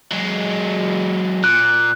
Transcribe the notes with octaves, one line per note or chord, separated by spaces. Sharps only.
F#3 G#3
A#2 F#6